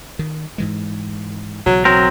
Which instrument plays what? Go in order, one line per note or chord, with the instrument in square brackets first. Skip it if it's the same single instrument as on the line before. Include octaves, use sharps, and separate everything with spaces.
[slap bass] D#3
G#2 E3 G#3
[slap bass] B1 C#3 E3 [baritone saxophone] F#3
[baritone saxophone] F#3 [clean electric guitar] C4 A#4